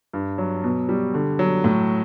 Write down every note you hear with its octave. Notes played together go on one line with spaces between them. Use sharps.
G2
F#3
B2
G3
D3
F#3
A2